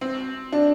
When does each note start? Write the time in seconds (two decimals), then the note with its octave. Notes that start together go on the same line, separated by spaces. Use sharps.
0.01 C4
0.52 D4